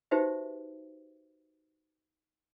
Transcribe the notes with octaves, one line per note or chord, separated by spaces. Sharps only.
D#4 F#4 G4 B4 C5 E5